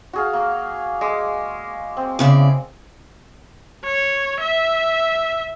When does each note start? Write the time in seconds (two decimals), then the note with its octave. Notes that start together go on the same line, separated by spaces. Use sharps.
0.13 F#4 G#4 F5
0.33 A#3
1.01 G#3 D6
1.97 C4
2.19 E2 C#3 D5
3.84 C#5
4.40 E5